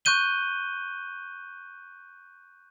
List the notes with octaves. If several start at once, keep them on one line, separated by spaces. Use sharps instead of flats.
C#6 F#6 G6 D#7 G7